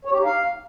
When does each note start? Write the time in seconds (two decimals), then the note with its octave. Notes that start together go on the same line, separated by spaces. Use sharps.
0.05 C#5
0.12 G4
0.18 D#4
0.25 F5